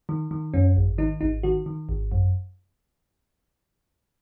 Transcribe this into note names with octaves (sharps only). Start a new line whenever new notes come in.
D#3
D#3
F#2 C#4
G#1
D#3 D#4
G#1 D#4
D#3 F#4
D#3
G#1
F#2